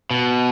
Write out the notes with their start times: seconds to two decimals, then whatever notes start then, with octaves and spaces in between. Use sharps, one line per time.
0.11 B2